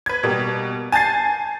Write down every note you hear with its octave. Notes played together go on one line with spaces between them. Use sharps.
B4 G#6
B2 G3 A#3
G#5 A5 G6 A6 C7